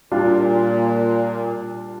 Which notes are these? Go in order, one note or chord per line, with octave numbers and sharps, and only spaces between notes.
A#2 G3 D4 F4